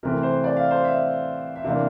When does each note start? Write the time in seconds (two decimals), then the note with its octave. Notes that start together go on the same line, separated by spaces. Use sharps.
0.03 C3 E3 A3 C4 A#4
0.23 C5
0.44 D5
0.57 F5
0.71 C5
0.84 E5
1.56 E5
1.64 C3 E3 A#3 D4 F5